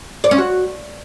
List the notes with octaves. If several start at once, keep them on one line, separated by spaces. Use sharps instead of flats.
D5
C#4
F#4